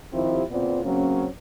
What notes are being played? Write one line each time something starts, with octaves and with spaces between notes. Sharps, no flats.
D#3 F3 C4 E4 G4
A#2 C#3 B3 C4 F4 D5
C#3 F#3 A#3 C4 C#4